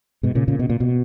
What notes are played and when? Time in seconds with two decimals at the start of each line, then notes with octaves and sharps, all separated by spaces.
0.23 G#2 B2
0.35 A#2 C#3
0.48 A#2 C#3
0.59 B2
0.70 A#2
0.80 B2